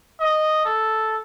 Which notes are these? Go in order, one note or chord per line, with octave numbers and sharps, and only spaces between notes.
D#5
A4